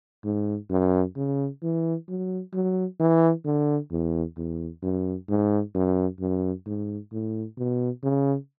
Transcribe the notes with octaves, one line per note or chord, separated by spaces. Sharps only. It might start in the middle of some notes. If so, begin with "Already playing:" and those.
G#2
F#2
C#3
E3
F#3
F#3
E3
D3
E2
E2
F#2
G#2
F#2
F#2
G#2
A2
B2
C#3